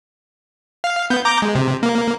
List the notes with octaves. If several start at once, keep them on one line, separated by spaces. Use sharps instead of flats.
F5
B3 G6
A#5 D6 G6
G#3
C3
A#3